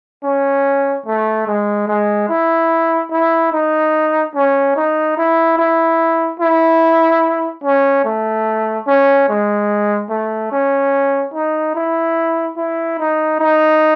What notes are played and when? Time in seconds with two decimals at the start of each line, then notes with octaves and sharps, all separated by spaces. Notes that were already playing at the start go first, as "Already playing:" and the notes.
0.24 C#4
1.06 A3
1.47 G#3
1.88 G#3
2.29 E4
3.11 E4
3.52 D#4
4.35 C#4
4.76 D#4
5.17 E4
5.58 E4
6.40 E4
7.64 C#4
8.05 A3
8.87 C#4
9.29 G#3
10.10 A3
10.52 C#4
11.34 D#4
11.74 E4
12.57 E4
12.98 D#4
13.39 D#4